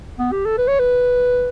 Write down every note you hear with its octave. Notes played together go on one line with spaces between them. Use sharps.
B3
G4
A4
B4
C#5
B4